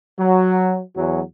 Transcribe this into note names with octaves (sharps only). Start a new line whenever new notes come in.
F#3
E2 F#3